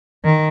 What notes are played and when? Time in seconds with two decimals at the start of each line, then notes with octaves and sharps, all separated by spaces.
0.25 D#3